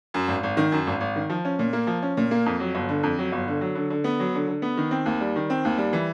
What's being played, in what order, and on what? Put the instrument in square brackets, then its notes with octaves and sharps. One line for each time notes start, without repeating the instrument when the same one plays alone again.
[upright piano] F#2
G#1
G#1
D#3
F#2
G#1
G#1
D#3
F3
C#4
A#2
A#3
F3
C#4
A#2
A#3
F2
F#3
G1
D3
F2
F#3
G1
D3
F#3
D3
D3
B3
F#3
D3
D3
B3
D#3
C4
D#2
G3
D#3
C4
D#2
G3
E3